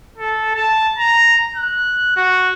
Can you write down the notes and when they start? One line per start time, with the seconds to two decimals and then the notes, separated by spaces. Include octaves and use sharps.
0.18 A4
0.55 A5
0.98 A#5
1.56 F#6
2.16 F#4